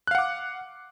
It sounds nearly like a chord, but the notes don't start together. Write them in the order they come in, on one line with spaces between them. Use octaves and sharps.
F#6 F5 F#5 D6